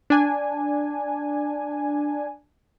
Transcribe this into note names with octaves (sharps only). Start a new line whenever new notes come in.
D4 G#5